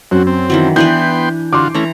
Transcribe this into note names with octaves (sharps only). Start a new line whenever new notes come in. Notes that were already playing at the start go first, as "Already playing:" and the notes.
F#2 C4 F#4
C4
D#3 E3 F#3
E3 B3 D4 B4 G5 C6 G6
D3 F4 F#4 C6 D6
E3 A3 C#4 A#5